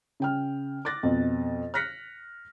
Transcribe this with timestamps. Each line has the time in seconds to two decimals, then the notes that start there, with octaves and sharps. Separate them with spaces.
0.20 C#3 G5 F6
0.85 D6 F#6 A6 A#6
1.03 F2 B2
1.74 F6 F#6 A#6 B6 C#7